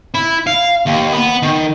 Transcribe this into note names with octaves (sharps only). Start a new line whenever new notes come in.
E4
F5
D#2
B3
D#3